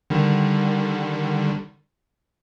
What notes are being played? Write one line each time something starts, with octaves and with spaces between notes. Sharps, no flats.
D3 D#3 G3